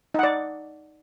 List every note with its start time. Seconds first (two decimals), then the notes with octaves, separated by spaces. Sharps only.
0.14 D#4
0.19 F#5
0.23 D5